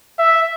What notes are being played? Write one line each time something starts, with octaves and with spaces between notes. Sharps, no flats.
E5